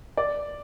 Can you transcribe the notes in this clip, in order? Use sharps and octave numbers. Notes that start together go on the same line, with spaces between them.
D5